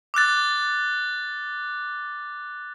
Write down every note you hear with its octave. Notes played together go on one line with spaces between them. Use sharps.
D6 E6 F#6 A6